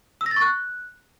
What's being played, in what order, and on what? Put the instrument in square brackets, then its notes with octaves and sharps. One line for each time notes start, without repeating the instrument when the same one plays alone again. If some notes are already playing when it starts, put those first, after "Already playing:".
[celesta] E6
A#6
A6
C#6
F#6